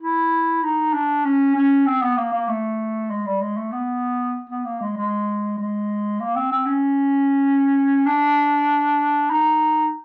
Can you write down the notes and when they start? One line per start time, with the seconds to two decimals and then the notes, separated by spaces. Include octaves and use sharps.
0.02 E4
0.63 D#4
0.93 D4
1.25 C#4
1.55 C#4
1.87 C4
2.03 B3
2.17 A#3
2.33 A#3
2.48 A3
3.11 G#3
3.26 G3
3.41 G#3
3.57 A3
3.72 B3
4.50 B3
4.65 A#3
4.81 G#3
4.97 G#3
5.58 G#3
6.20 A#3
6.36 C4
6.52 C4
6.66 C#4
8.06 D4
9.30 D#4